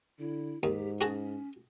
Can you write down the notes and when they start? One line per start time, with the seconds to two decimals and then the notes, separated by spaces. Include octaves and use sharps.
0.19 D3 E4
0.63 D#2 G#2 G4
1.01 C#4 F#4 G#4 A5